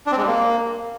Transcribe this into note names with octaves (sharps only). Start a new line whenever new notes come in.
D4
C4
G#3
G3
A#3